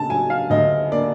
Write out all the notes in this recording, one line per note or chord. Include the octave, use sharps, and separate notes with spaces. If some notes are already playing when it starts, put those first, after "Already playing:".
Already playing: C#3 A#3 A5
F#3 G#5
F5
D2 D#5
A#3 D5